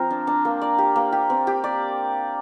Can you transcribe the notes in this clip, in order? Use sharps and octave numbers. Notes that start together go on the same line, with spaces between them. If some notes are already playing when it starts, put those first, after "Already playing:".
Already playing: F3 C4 A#4
D4
D4
A#3
D5
G4
A#3
G4
C4
G4
D5